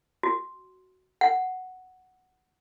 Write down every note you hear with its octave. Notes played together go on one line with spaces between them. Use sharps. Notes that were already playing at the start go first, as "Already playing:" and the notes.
F#4
F#5